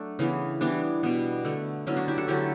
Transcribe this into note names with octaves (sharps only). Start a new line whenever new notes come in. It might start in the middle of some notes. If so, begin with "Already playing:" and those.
Already playing: F#3 A3 D4
C#3 E3 B3
E3 G3 B3 D4
B2 G3 B3
D3 A3
D3 F#3 B3 C#4 E4
D4 F#4
E4 G4
F#4 A4
D3 F#3 A3 E4 G4